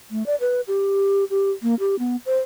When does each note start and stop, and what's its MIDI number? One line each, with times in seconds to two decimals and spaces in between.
0.11 0.25 57
0.26 0.35 74
0.41 0.61 71
0.68 1.24 67
1.30 1.51 67
1.63 1.75 58
1.80 1.95 67
1.99 2.16 59
2.26 2.38 72